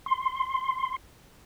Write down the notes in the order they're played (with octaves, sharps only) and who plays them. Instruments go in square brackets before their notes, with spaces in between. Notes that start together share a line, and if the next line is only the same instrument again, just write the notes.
[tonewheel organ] C6